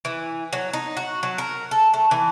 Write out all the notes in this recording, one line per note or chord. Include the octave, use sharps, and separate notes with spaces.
E3
F#3
D#4
F#4
F#3
A#4
A4
A3
E3